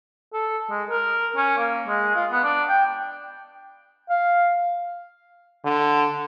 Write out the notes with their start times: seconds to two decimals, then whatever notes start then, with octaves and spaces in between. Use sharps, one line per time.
0.33 A4
0.70 G#3
0.90 A#4
1.36 C#4
1.58 A#3
1.87 G#3
2.15 F4
2.31 B3
2.44 D4
2.69 G5
4.10 F5
5.65 D3